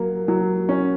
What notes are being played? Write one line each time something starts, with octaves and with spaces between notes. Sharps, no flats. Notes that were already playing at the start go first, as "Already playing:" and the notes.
Already playing: F#3 A#3
F#3
C#4